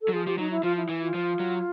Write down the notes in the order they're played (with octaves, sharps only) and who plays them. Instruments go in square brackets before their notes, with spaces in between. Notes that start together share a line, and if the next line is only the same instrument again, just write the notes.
[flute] A4
[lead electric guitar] F#3
[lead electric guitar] F3 [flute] G#4
[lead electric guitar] F3 [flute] G4
[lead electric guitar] F#3 [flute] D#4
[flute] E4
[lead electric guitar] F3 [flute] F4
[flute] E4
[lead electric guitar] E3
[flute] F4
[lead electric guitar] F3
F#3